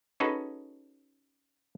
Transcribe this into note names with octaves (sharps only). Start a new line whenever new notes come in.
C#4 D#4 F#4 G#4 A4 B4